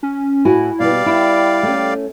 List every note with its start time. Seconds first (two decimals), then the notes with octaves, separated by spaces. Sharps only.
0.03 C#4
0.45 A2 E4 F#4 G#5
0.80 B2 G3 B3 D5 F5
1.06 E4 G5
1.63 A3 C#4